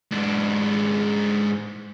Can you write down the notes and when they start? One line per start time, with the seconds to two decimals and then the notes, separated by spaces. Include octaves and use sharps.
0.12 G#2 D4